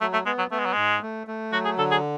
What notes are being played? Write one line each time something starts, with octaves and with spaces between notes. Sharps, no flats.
F#3 A3
A3
G#3 B3
F#3
A3 B3
G#3
F#3
G#2 G#3
A3
A3
F#3 F#4
G#4
D3 A4
G#4